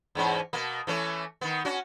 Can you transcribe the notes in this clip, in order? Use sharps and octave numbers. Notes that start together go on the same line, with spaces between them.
E2 G#2 C#4
B2 A#3
E3 A3 C#4
D#3 B3
C#4 F#4